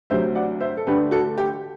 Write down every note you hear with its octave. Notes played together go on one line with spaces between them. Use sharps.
D2 C3 F#3 C5 E5
D5 F#5
C5 E5
A4
D2 D3 A3 D4 G4 B4
F#4 A4
G4